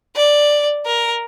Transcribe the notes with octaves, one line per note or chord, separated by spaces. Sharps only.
D5
A#4